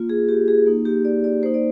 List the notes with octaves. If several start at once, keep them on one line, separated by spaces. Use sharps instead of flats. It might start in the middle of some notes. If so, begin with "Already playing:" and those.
Already playing: A#3 F4
G#4
G4
G#4
A#3 D#4
G4
D5
D5
A#3 D#4 C5
D5